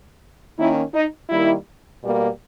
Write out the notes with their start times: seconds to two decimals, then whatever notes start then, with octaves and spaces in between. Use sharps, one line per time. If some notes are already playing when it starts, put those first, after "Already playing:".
0.58 D#3 A#3 C#4 E4
0.94 D#4
1.29 D#3 G3 A#3 E4
2.02 B2 G3 A#3